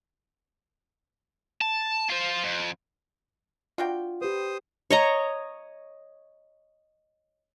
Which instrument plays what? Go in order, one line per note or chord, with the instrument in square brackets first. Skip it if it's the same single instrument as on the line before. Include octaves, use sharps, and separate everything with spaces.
[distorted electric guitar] A5
F4 C5
F2
[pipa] D4 F#4 G5 [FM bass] F4
[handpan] G4 B4 [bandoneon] C5 D#6
[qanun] C#5 D#5 A#5